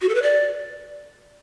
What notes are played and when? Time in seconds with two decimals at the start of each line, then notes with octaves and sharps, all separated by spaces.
0.02 F#4
0.09 A4
0.15 B4
0.22 D5